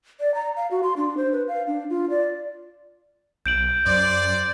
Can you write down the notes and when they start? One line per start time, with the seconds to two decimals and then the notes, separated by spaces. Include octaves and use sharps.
0.20 D5
0.35 A#5
0.56 F5
0.71 F#4
0.83 C6
0.97 D4
1.17 C5
1.32 B4
1.48 F5
1.67 D4
1.90 F4
2.10 D5
3.46 B1 G6 D7 F#7
3.86 F#2 C5 D5